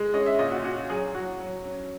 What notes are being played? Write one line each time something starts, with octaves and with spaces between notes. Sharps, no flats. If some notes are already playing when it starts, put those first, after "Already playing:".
Already playing: G#3
C#4 D#5
E5
A#2 D#5
F#4
C#4 F#4
F#3 G#4
F#3 F#4
F#3
C#4